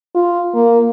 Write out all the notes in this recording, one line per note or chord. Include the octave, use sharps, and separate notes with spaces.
F4
A#3